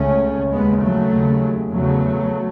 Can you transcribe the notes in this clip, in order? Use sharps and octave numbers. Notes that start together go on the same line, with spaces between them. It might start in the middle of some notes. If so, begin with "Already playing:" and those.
Already playing: C#2 C#3 A3 C#4
D#2 C#3 G#3 B3
F#3 A3
D#2 C#3
E2 C#3 F#3 A3